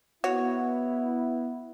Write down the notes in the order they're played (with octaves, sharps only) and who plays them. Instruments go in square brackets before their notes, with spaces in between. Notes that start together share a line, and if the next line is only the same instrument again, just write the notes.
[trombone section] B3 E4 [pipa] F#4 C#5